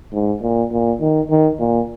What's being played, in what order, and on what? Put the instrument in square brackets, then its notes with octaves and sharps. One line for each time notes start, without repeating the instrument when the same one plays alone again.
[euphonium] G#2
A#2
A#2
D#3
D#3
A#2